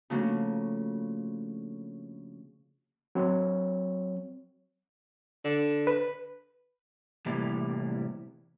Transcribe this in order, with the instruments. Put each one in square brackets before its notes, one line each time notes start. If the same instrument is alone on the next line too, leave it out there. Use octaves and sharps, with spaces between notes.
[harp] C#3 F3 A3 A#3 D4 F#4
[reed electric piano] F#3 C4 C#5
[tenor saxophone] D3
[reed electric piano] B4
[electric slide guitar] A2 C3 E3 G3 A#3